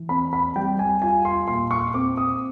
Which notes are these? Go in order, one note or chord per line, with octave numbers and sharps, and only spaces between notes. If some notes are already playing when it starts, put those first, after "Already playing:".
Already playing: E3
C4 B5
B5
G3 G5
G#5
F4 G#5
C6
A#2 C6
C#6
C4 D6
D#6